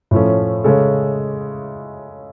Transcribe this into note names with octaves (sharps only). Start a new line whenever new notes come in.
A2 F3 A3 C#4
C#3 G#3 C#4 A4